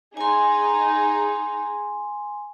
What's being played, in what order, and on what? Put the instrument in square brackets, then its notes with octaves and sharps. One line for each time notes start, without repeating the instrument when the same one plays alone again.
[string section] D#4 G#4 [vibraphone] G#5 C6